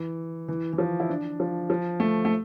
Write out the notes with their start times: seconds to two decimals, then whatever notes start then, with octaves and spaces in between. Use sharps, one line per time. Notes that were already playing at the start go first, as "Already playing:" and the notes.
Already playing: E3
0.48 E3
0.73 E3
0.78 F3
1.00 E4
1.09 D4
1.40 F3
1.70 F3
2.00 A3
2.25 A3